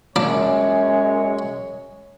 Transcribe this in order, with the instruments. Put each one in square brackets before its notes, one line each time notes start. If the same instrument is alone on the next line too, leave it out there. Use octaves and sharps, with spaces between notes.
[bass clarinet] F#2 [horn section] A#2 F#3 C#5 [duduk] G#3 [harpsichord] D4